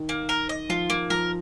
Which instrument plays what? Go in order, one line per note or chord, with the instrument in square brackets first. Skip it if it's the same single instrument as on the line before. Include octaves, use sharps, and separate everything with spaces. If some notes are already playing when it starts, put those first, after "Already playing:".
Already playing: [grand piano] D#3
[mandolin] A#3
A#4
D#5
[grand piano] F3 [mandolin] F4
[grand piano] F3 [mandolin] A#3
[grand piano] F3 [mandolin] A#4